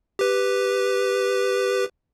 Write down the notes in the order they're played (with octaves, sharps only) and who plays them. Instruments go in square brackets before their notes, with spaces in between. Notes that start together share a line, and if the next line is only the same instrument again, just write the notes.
[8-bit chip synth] G4 B4